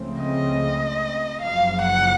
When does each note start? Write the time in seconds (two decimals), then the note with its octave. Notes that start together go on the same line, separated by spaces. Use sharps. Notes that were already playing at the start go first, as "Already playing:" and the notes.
Already playing: C#2 C#3 F3 A3 C4
0.20 D#5
1.41 F#1 F#2 F3 F5
1.82 F#5